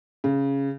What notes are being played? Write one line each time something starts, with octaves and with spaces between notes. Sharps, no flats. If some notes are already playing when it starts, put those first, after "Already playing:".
C#3